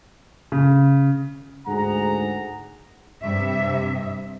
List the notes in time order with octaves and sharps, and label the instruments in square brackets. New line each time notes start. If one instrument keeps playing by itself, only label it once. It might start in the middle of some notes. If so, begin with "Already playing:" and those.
[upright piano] C#3
[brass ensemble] D2 G#2 G#4 F#5 A#5
[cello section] G2 C3 E5